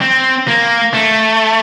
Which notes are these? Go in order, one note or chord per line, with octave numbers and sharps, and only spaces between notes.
C4
A#3
A3